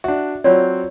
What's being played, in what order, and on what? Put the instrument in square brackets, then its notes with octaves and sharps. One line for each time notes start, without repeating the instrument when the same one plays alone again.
[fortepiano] D4 F#4 [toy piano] E5
[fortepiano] F#3 C4 [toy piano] F4 C#5 D5